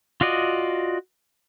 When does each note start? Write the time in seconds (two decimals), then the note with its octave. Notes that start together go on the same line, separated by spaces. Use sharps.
0.21 F4 F#4 D5 D#5